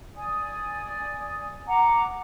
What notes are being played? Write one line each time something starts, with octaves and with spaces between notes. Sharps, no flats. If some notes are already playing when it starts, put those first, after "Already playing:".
D5 G#5 D#6
F#5 A#5 D6